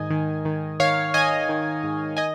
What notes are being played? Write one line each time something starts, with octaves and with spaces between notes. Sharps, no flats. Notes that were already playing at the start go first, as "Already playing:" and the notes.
Already playing: G#2 D#3 D#5 G#5
D#3
D#3
D#3 C#5 F5
D#3 D#5 G#5
D#3
G#2
D#5 G#5